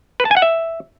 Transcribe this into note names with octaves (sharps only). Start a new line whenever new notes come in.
B4
A5
G#5
F#5
E5